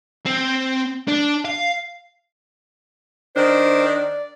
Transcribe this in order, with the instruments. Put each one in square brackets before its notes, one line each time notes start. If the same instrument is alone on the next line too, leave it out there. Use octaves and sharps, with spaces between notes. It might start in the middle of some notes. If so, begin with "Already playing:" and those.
[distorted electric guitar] C4
D4
F5
[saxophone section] D#3 D4 [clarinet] C5
[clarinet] D5